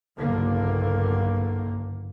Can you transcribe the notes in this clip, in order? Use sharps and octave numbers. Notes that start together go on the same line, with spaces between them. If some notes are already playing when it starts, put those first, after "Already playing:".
F#1 B1 G2 D3 A#3